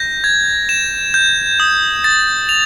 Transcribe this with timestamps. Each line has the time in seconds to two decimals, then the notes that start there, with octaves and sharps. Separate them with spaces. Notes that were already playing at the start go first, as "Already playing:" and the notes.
Already playing: G6 A#6
0.24 G#6
0.69 E7
1.14 G6
1.60 D#6
2.04 A6
2.49 F7